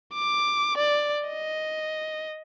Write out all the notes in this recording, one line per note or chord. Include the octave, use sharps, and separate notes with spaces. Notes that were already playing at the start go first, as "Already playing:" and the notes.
D6
D5
D#5